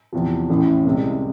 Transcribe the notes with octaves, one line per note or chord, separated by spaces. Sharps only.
E2 C3 F3
A1 A2 E3
C2 C3 G#3